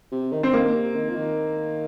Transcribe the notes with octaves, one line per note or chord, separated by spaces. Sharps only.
C3
D#3
D3 C4
D#3 A#3
C3
D#3
F3
D#3